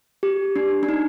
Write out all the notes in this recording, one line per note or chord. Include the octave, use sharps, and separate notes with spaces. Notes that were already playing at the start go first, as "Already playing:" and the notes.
G4
D4
D4
D#4